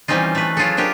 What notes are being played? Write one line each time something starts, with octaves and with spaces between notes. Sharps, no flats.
E3 G3 C4 C#4 D#4 F4
A3 B4
F#3 F4 G#4 A4
C4 D4 F4 G4 A#4